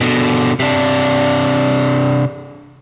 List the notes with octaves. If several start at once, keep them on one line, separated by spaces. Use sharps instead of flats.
B2 D3
C3 D4